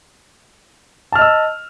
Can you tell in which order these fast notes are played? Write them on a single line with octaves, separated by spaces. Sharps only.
A5 F6 D#5 E6